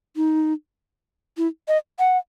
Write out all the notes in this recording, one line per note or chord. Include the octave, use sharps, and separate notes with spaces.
D#4
E4
D#5
F#5